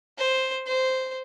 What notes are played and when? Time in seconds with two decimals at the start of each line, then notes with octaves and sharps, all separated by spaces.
0.18 C5
0.67 C5